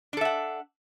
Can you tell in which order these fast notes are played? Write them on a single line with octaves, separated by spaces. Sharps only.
D4 A4 E5 F#5